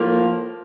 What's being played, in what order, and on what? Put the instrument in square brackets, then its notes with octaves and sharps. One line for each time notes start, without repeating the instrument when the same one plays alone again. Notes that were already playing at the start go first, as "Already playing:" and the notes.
Already playing: [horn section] A2 F3 A#3